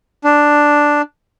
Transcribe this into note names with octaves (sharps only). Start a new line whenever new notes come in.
D4